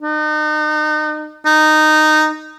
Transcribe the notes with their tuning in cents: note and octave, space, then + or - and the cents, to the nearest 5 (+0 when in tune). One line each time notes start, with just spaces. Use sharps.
D#4 -35
D#4 -15